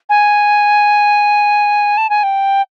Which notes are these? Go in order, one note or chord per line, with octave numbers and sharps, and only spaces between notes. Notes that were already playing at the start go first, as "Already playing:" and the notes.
G#5
A5
G#5
G5